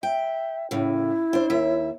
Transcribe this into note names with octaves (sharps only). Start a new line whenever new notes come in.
E5 G5
A2 C#3 E4
D4 C5
D#2 E5